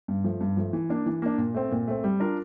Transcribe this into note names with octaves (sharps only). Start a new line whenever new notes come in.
G2
F3 A3
G2
F3 A3
E3
A#3 D4
E3
A#3 D4
A#2
A3 C4
A#2
A3 C4
G3
D4 F4 A#4